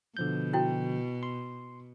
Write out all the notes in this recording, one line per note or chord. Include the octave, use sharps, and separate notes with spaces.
B2 D3 F3 G6
E4 F#4 G5
C6